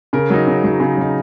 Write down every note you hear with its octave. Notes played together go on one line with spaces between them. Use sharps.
C#3 A#4
F#3 D#4
C#3
F#3 D#4
C#3
F#3 D#4